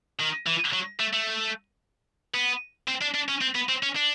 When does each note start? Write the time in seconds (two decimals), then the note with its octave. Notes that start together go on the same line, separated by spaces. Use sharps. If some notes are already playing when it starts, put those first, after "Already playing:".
0.20 D#3
0.46 E3
0.73 F#3
1.00 A3
1.13 A3
2.34 B3
2.88 C4
3.02 D4
3.15 D4
3.29 C#4
3.42 C4
3.55 B3
3.69 C4
3.83 C#4
3.96 D4